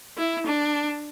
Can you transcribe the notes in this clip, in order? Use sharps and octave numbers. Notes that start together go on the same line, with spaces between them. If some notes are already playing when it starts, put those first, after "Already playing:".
E4
D4